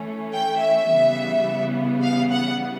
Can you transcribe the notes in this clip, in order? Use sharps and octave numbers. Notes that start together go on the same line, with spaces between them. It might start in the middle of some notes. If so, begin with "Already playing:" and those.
Already playing: E3 A3 C#4
G5
E5
C#3 E3 G3 B3
F5
F#5